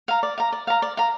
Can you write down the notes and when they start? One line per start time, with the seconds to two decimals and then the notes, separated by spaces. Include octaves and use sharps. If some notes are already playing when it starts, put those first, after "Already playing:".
0.08 F5 A#5
0.23 D5
0.38 F5 A#5
0.52 D5
0.67 F5 A#5
0.82 D5
0.97 F5 A#5